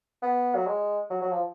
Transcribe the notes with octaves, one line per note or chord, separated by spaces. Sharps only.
B3
F#3
G#3
F#3
F#3
F3